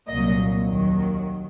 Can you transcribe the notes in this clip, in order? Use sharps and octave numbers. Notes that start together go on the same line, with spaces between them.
C2 A#2 F#3 D#5
D#2 D#3 F#3